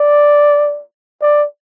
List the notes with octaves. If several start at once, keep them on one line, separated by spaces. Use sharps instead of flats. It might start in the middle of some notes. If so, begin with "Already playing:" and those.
Already playing: D5
D5